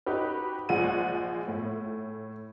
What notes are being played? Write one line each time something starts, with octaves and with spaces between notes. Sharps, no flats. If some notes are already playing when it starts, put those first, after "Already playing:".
D#4 F#4 G4 B4
A#1 F3 G#3 F#5 D#7
A2